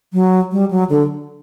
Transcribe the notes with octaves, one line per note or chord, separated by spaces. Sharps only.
F#3
G3
F#3
D3